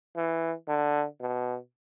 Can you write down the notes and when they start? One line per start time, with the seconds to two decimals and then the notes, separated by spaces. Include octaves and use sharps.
0.16 E3
0.68 D3
1.20 B2